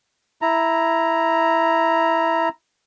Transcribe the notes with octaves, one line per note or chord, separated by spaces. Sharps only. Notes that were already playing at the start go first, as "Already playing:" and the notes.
E4 A#5